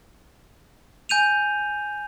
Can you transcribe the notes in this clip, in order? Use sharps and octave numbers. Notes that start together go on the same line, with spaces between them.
G#5 G6 D#7 F7